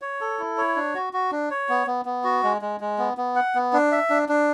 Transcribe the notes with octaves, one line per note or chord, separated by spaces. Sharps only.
C#5
A4
E4
C#5
D4
F#4
F#4
D4
C#5
B3
B3
B3
F#4
G#3
G#3
G#3
B3
B3
F#5
B3
D4
E5
D4
D4